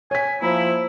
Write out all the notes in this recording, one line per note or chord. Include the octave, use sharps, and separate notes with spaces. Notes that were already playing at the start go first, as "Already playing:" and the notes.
C#5 G#5 B6
F3 A#3 E4 C5 A#5